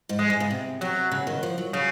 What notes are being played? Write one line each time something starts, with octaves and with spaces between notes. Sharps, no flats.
G#2
G#3
G#2
C#3
C3
C3 F#3
C#3
D#3
F3
F#3
C#3 F#3